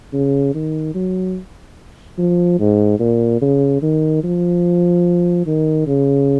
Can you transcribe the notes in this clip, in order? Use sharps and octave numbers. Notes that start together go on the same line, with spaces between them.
C#3
D#3
F#3
F3
G#2
A#2
C#3
D#3
F3
D#3
C#3